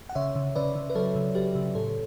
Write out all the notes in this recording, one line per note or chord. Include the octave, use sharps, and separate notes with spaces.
F#5
C#3 C#5 E5
C#3
C#3 B4 D5
C#3
B4
F#3 A4 C#5
C#3
F#3 G4 B4
C#3
A2 A4 C#5